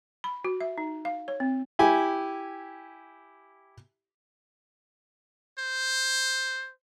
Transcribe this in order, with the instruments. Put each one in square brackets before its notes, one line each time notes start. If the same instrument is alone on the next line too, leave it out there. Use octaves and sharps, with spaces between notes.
[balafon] B5
F#4
E5
D#4
F5
C#5
C4
[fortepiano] E4 G4 G#5
[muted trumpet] C5